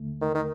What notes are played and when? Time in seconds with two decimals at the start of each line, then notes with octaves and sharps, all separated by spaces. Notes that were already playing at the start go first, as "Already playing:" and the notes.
Already playing: D#2 D3 A3
0.21 D#3
0.34 D#3